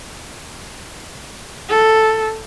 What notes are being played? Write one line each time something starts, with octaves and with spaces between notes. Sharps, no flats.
A4